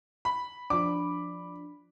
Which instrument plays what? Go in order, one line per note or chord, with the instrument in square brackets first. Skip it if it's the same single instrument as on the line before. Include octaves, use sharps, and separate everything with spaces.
[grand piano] B5
[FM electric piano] F3 D4 [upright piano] D6